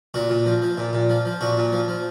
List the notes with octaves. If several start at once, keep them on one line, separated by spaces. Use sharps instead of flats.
A#2 F#4
A#2
F3
F3
A#2
A#2
F3
F3
A#2 F#4
A#2
F3
F3